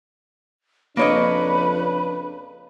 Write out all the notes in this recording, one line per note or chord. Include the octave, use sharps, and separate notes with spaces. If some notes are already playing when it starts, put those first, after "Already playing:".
F2 C#3 A#3 D4 B4 C#5 D#5 B5